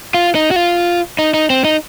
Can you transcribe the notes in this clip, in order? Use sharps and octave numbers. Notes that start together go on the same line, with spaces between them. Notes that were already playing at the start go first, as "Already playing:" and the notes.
F4
D#4
F#4
F4
D#4
D#4
C4
D#4